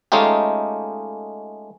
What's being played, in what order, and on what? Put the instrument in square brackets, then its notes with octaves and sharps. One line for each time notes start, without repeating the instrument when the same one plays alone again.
[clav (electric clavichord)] G#3 A3 C#4 D#4 F4 G4